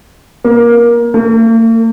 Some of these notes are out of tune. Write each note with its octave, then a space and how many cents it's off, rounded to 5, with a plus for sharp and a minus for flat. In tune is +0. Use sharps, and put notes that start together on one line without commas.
A#3 +20
A#3 -45